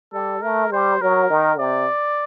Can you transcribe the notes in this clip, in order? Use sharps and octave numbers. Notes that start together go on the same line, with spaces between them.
G3 A4
A3 A#4
G3 C5
F#3 A#4
D#3
C3 D5